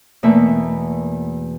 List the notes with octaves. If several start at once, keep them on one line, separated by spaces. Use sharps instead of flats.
E2 B2 A3 A#3 E5 B5